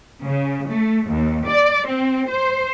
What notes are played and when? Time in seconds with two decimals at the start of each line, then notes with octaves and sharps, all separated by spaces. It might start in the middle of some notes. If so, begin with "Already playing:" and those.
0.24 C#3
0.68 A3
1.08 D#2
1.47 D5
1.88 C4
2.28 C5